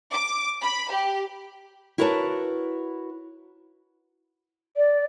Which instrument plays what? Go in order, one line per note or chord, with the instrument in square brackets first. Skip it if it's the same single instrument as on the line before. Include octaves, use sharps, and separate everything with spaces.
[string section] D6
B5
G4
[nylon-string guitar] E4 F#4 A#4 B4 C#5 A5
[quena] D5